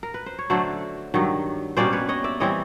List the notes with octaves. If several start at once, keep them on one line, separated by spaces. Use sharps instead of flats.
A#4
B4
C5
C#5
D3 F#3 A3 C5 D5
G2 D#3 F#3
B2 G3 A#3 C#4 C5 D5
B4 C#5
C#5 D#5
D5 E5
E3 G3 C4 C#5 D#5